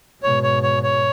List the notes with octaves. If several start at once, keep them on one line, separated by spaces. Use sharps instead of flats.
G#2 B2 C#5
C#5
C#5
C#5